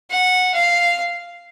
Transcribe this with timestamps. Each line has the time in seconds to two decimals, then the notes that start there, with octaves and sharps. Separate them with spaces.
0.10 F#5
0.54 F5